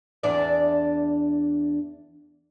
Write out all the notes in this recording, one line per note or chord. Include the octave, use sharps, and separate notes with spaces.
E2 D4 D5